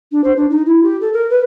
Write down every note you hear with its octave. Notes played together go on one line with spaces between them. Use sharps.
D4
C5
D4
D#4
E4
G4
A4
A#4
B4